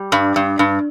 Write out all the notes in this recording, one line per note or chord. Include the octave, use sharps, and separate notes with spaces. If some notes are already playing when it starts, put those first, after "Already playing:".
Already playing: G3
G2
G2
G2